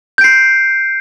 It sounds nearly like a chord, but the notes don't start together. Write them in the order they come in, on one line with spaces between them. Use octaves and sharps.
G6 D7 C7